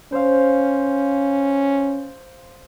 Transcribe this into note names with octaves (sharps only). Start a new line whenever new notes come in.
C#4 C5 F5